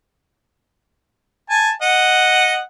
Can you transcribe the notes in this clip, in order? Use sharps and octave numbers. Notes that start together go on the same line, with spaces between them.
G#5 A5
D#5 F#5